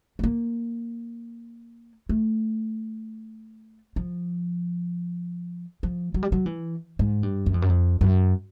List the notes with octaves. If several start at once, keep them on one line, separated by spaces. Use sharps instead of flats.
A3
A#3
A3
F3
F3
F#3
G3
F#3
E3
G#2
G2
F#2
F2
F#2
F2
F#2